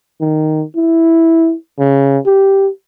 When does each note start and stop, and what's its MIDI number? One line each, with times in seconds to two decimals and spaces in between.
0.21 0.64 51
0.76 1.54 64
1.79 2.18 49
2.26 2.69 67